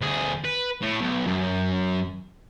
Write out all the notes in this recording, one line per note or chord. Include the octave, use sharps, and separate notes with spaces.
D2 G#4
B4
A2
B1
F#2